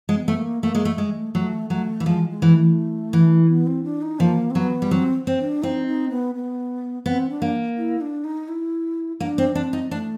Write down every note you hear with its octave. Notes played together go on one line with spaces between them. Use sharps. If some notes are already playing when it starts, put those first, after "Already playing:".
G#3
C4
B3
A3
A#3
A3 A#3
G#3
A3
G#3
A3
F#3 A3 A#3
F#3 A3
E3
F3 G#3
G#3
E3
A3
E3
B3
C4
D4
D#4
F3 A#3
C4
F#3 B3
G3
F#3 C4
C4
D4
C4 D#4 E4
D#4
B3
B3
B3 C4
D4
A#3
E4
D4
D#4
E4
A#3 D4
C4
C4 D4
D#4
A3 D4